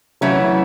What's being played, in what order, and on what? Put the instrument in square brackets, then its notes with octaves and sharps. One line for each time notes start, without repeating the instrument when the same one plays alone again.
[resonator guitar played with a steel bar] C#3 E3 A3 C#4 E4 [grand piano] F#3